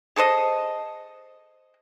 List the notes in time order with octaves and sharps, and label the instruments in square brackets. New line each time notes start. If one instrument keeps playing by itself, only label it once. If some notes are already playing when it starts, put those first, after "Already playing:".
[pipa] G#4 A4 C5 D#5